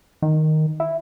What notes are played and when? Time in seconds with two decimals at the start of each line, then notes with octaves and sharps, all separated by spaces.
0.22 D#3
0.80 E4